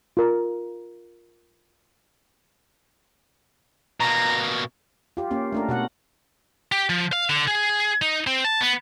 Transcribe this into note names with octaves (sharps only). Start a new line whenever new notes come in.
F4 A#4
B2 A#3 A#5
F4 G4
A#3 C#4 G4
A3 D4 A#4
B2 F#4 F#5
G4
F3
F5
D3
G#4
D#4
C4
A5
B3